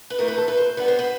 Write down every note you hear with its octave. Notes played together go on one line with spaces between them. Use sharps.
B4
E3 A3 C4 A#4
B4
A4
B4
C5
D3 G3 B3 B4
C5
B4